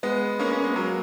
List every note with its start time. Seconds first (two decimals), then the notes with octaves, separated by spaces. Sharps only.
0.03 G#3 B3
0.39 A#3 C#4
0.51 A#3 C#4
0.64 G#3 B3
0.76 F#3 A#3